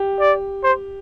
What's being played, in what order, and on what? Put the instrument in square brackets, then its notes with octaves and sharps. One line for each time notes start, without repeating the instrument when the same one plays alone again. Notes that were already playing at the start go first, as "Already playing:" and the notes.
Already playing: [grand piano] G4
[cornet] D5
C5